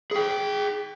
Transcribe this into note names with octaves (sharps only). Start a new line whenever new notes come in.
G#4 G5